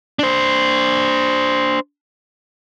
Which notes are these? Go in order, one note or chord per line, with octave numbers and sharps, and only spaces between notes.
D4 C5